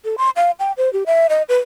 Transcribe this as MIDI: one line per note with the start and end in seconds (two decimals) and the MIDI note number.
0.05 0.15 69
0.18 0.30 84
0.36 0.51 77
0.59 0.72 79
0.77 0.92 72
0.93 1.04 67
1.06 1.27 76
1.29 1.42 75
1.49 1.58 71